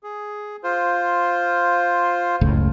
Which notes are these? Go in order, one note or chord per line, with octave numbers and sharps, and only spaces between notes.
G#4
F4 C5
F#1 C#2 A2